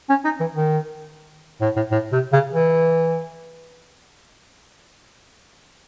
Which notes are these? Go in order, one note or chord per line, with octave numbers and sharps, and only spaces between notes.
C#4
D#4
E3
D#3
A2
A2
A2
C3
C#3
E3